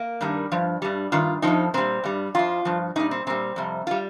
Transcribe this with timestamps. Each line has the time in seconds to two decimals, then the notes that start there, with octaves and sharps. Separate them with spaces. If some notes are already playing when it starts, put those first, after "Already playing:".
Already playing: A#3
0.21 G2 D#3 G3
0.52 G2 F3
0.82 G2 G3
1.12 G2 D#3 F4
1.42 C3 F3 D#4
1.47 F2
1.74 A#2 G3 C4
2.04 G2 G3
2.35 F2 F3 F4
2.65 G2 F3
2.96 A#2 G3 D#4
3.11 C4
3.27 A#2 G3 C4
3.56 F2 C3 G3
3.87 G3 F4